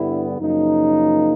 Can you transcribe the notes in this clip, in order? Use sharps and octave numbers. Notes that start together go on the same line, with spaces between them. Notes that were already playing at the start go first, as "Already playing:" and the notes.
Already playing: G2 D3 G3 B3 E4
F#2 C#3 F3 A#3 D#4